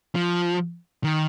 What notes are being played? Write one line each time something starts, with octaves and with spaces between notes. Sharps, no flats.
F3
D#3